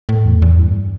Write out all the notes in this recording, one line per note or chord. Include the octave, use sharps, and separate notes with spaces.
A2
E2
E2
G2